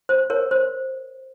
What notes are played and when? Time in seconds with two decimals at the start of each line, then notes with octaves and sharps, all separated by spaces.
0.09 C5
0.30 A#4 C#5
0.51 C5